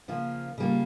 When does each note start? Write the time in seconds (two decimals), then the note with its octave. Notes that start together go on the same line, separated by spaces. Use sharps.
0.08 C#3 F3 A#3 F4
0.58 C#3 G3 A#3 F4